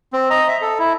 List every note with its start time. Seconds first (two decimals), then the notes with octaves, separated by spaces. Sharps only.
0.13 C4
0.30 D#5 A#5
0.48 E5
0.61 A4
0.79 E4